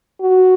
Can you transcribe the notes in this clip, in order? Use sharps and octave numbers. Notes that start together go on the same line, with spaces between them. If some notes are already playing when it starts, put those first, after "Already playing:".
F#4